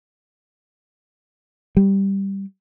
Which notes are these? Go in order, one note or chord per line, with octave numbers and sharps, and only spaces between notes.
G3